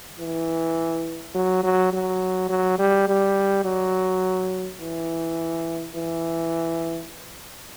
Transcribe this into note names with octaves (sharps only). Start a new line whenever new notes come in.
E3
F#3
F#3
F#3
F#3
G3
G3
F#3
E3
E3